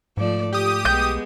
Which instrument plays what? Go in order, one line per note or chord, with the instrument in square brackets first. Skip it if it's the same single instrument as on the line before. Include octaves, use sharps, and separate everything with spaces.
[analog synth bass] G#2 [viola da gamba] F3 A3 D5
[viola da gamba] F3 [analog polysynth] G4 D#6
[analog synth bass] B1 [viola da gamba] G#3 B3 [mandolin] G6